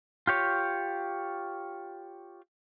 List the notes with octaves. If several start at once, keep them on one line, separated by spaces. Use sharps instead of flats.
F4 G4 C#5